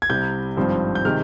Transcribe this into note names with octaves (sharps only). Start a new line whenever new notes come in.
G#6
C2 C3 G3 G6
G#1 G2 F3 C4
G6
C3 D#3 G#3 F6